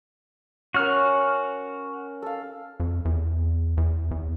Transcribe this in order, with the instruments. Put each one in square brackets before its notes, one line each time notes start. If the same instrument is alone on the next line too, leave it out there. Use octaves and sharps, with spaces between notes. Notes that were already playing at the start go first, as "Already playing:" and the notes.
[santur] C#4 A#4 [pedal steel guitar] F#4 F6
[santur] A4 F5
[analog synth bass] F2
E2
E2
E2